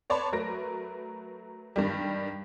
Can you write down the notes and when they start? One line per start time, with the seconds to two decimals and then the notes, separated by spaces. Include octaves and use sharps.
0.10 B4 C#5 D5 A5 B5 C6
0.32 F#3 A3 A#4 B4 A#6
1.76 G2 D#3 G3